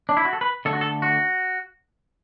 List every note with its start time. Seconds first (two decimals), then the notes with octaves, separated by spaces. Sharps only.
0.09 D4
0.17 E4
0.25 F#4
0.33 A4
0.41 B4
0.65 D3 A3 A4
0.73 F#4
0.81 A4
1.02 F#4